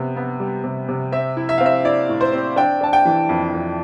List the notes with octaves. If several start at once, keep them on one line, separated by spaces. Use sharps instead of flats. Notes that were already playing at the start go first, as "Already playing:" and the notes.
Already playing: C3 B3
B3
G3
C3
C3
C4 E5
E4
E5
C4 F5
E5
E4 D5
A2
C5
C4
D4 G5
D4 A5
G5
E3
F2
F2